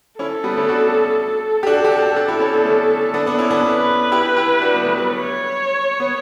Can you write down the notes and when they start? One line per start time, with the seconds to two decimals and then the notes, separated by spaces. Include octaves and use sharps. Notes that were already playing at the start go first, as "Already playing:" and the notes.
0.19 C#4 E4 A4
0.44 G3 B3
0.57 A3 C#4
0.68 D4 F#4
1.63 G4
1.66 D4 F#4 A4
1.85 G4
1.91 D4 F#4
2.16 D4 F#4
2.28 E4 G4
2.40 C#4 E4
2.53 B3 D4
2.65 A3 C#4
3.14 B3 D4
3.26 B3 D4
3.38 C#4 E4
3.50 B3 D4
3.63 B4
4.12 E4 G4
4.36 E4 G4
4.61 D4 F#4
4.74 G3 B3
4.86 F#3 A3
4.98 G3
5.10 C#5
6.00 B3